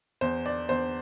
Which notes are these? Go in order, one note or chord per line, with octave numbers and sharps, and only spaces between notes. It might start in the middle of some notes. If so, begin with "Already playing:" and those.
E2 C5
D5
E2 C5